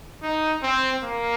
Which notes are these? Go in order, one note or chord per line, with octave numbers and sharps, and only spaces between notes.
D#4
C4
A#3